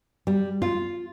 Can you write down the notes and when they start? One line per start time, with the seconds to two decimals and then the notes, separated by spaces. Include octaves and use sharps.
0.27 G3
0.62 F4